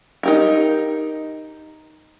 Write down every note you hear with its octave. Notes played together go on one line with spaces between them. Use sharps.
D#4 G4 A#4